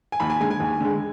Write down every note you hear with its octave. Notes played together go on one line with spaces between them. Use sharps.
G#5
D#2 B5
G#5
D3 G#3 G#5
G#5
D#2
D3 G#3